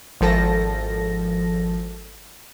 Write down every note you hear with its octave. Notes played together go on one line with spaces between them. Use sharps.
G#1 F3 A4 A5 A#6